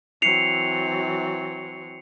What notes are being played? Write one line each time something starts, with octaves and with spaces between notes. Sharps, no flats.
E3 F#3 C4 C7 C#7 F7